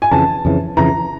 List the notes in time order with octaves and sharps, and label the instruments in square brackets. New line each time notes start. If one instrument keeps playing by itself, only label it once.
[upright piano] G#5
[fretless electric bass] F2 C#3 E3 [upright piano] A5
[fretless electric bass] F2 C#3 E3
[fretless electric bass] F2 C#3 E3 [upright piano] A#5